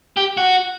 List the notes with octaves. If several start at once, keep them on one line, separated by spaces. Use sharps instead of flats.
G4
F#4